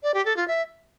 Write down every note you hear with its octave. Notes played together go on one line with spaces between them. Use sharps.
D5
G4
A4
F4
E5